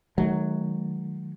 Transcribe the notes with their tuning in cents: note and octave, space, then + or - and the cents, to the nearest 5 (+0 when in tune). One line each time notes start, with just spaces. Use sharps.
D#3 +0 F#3 +0 A3 -45